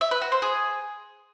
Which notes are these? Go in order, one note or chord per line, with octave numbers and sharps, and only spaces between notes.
E5
B4
F#4
C5
G#4